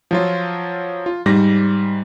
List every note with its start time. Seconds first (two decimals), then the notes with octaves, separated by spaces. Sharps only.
0.11 F3 F#3 F4
1.06 F4
1.26 G#2 G3 A#6